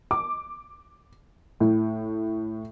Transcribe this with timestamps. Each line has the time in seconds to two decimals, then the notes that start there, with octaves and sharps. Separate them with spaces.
0.11 D6
1.60 A2